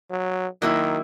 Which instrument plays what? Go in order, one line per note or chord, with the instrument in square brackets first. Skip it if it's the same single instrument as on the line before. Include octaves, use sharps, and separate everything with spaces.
[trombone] F#3
[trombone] D#3 [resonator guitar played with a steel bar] F#3 A#3 E4